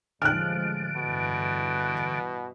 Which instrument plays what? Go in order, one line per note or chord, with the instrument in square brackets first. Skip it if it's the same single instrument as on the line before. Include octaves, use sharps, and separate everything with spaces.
[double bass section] A1 F3 G#3 [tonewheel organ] D3 [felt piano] F6 F#6
[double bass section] G2 E3 [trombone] B2